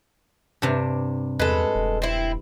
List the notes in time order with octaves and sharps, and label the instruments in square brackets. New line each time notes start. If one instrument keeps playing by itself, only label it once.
[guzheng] G2 C3 D4
[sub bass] E2 [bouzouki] G#3 A4 [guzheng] B4
[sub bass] E1
[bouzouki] C4 E4